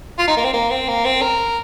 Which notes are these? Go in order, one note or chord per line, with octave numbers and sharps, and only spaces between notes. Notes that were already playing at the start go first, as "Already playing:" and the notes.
F4
D#4
A#3
C4
A#3
C4
A#3
C4
A#4